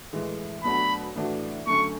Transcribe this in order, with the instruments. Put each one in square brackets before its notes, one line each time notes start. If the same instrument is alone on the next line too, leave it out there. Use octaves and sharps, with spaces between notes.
[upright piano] A2 E3 G#3
[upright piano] B2 F#3 A3 D4 F#4 [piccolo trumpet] B5
[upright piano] A2 E3 A3 D4 F#4
[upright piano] F#2 D3 A3 [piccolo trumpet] C#6